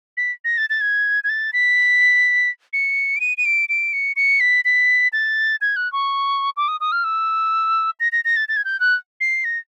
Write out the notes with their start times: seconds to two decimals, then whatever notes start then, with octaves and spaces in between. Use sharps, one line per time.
0.17 B6
0.44 A#6
0.58 A6
0.70 A6
0.81 G#6
1.24 G#6
1.29 A6
1.53 B6
2.73 C#7
3.16 D7
3.20 D#7
3.37 D#7
3.45 D7
3.69 D7
3.93 C#7
4.16 C#7
4.40 B6
4.65 B6
5.13 A6
5.61 G#6
5.76 F#6
5.92 C#6
6.57 D6
6.68 D#6
6.80 D#6
6.92 F6
7.04 E6
8.00 A#6
8.12 A#6
8.25 A#6
8.36 A6
8.49 A6
8.56 G#6
8.65 G6
8.80 F#6
9.21 C7
9.44 A#6